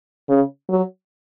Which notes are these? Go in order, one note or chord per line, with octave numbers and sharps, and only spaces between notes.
C#3
F#3